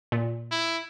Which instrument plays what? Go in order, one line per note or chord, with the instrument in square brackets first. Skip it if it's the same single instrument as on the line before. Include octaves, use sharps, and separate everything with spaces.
[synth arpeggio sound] A#2
[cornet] E4